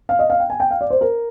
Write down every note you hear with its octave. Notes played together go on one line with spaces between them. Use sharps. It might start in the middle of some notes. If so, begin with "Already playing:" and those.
F5
D#5
F5
G5
G#5
G5
F5
D5
C5
A#4